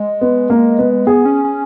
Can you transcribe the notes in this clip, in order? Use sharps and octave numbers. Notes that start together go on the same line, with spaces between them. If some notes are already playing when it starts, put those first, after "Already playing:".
Already playing: G#3
B3
A#3
B3
B3 G#4
C#4
C#4